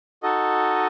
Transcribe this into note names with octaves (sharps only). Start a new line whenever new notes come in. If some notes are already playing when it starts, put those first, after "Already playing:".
D#4 F#4 A4 D#5